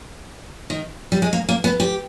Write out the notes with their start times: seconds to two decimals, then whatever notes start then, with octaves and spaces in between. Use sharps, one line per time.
0.70 D#3
1.12 G3
1.22 G#3
1.33 A#3
1.49 A#3
1.64 B3
1.80 G4